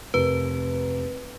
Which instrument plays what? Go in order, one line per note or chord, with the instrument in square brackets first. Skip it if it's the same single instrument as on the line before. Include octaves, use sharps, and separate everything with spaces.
[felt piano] F1 A#4 [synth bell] B4